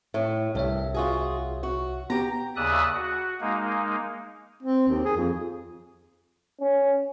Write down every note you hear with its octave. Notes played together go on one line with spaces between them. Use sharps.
A2
C2 G2 C#5 E5
F4 F#4 G#4
F#4
B3 G4 A#5
D#2 C#3 D5 E5 D#6 F#6
F#4
G#3 A#3 D#4
C4
D#2
G#4
F2
C#4